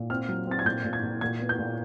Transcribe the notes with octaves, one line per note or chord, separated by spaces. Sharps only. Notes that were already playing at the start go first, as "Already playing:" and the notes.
Already playing: A#2
C4 F6
F#3
C4 A6
G#6
A#2 G6
A#2
G#6
A#2
A#2 G#6
B3
G6
A#2